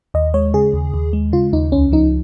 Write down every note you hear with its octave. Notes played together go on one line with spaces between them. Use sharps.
D#2 D#5
G#3 C#5
C#3 G#4
D#2
D#2
G#3
C#3 F4
D#2 D#4
C#2 C#4
F3 D#4